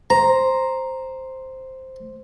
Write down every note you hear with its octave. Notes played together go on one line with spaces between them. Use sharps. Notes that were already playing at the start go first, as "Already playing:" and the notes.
C5 A#5